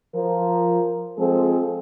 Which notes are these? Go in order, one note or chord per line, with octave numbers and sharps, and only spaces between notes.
F3 A#4
F3 G#3 C4 G#4 A4